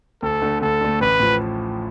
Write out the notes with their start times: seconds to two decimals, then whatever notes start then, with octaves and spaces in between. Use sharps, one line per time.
0.22 D2 A4
0.42 D3 A3
0.61 D2 A4
0.81 D3 A3
1.01 A1 B4
1.20 A2 F3